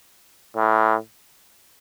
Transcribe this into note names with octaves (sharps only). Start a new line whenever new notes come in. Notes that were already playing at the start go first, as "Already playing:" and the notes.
A2